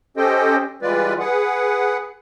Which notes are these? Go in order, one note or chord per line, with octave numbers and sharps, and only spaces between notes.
C#4 G4 A4 C5 D#5 G5
E3 G3 G#3 F4 B4 D5
G#4 B4 F#5